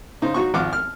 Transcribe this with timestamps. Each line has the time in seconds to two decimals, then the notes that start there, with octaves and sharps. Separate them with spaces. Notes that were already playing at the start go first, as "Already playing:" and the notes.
0.22 C#3 D#4 C5
0.34 F#3 D#4 F#4 C#6
0.54 G#1 F3 F#5 D6 F6
0.73 F6